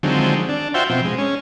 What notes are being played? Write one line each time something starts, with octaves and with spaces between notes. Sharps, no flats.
D3 D#3 F3 F#3 G#3 C4
D4
F4 F#4 C5 E5 G5
B2 F3 C4
G#3
C#4